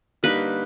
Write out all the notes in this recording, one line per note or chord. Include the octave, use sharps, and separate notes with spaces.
D3 G3 A#3 D#4 B4